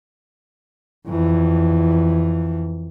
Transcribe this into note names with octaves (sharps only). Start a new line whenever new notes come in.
F2 E3